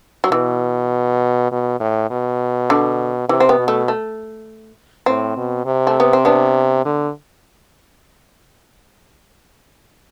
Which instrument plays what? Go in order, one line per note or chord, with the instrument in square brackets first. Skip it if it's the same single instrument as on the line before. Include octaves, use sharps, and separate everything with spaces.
[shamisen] F#3
[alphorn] B2 [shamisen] E3
[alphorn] B2
A2
B2
[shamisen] D3
[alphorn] C3 [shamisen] E3
[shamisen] C4
B3
[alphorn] B2
[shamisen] A3
A3
[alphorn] A2 [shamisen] C4
[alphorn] B2
C3
[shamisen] A3
B3
C4
B3 D4
[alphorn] D3